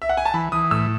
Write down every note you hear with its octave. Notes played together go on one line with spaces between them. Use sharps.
E5
F#5
G#5
A5
E3 B5
E3 D#6
A2 E6